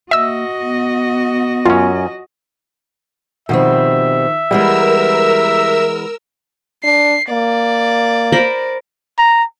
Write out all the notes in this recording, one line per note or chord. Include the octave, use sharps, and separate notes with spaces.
A#3 F#4 D#5 E5 E6
B3
F#2 C#4 F4
B2 D#3 F3 G3 C4 E5
E3 G3 G#3 B3 A#4 E6
D4 C7
A#3 D5
A#4 C5 B5
A#5